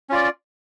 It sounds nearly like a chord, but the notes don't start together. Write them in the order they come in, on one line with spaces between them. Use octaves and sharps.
C#4 F4 D5